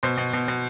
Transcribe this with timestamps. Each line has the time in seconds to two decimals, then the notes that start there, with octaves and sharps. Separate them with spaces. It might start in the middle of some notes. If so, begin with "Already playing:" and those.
0.03 B2 C5
0.17 B2
0.33 B2
0.48 B2